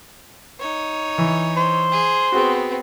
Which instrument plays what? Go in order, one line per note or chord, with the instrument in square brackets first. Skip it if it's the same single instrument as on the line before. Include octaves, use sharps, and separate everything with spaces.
[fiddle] D#4 C#5
[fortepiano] E3
[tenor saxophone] C5
[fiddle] G#4
[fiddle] B3 C4 [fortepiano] F#4 G#4